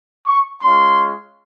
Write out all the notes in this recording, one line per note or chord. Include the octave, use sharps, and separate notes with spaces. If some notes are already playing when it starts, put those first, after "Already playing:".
C#6
G#3 C#4 F4 C6